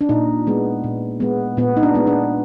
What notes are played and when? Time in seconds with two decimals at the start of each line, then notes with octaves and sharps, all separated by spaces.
0.01 D4
0.09 A#2 D#4
0.47 G#3 B3
0.84 A#2
1.20 G#3 B3
1.57 A#2 B3
1.77 D#4
1.83 D4
1.94 G#3 B3
2.07 D4